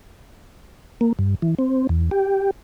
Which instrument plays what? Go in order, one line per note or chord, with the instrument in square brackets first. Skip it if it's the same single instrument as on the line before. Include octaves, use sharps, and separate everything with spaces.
[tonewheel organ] A#3
G2
E3
C4
E2
G4